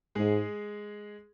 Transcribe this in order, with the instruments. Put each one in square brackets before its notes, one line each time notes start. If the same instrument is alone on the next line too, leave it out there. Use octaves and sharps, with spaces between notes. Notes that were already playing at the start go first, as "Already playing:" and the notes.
[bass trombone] G#2 [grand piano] G#3 G#4